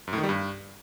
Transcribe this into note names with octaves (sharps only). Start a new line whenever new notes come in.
F#2
A2
D#3
G3
G2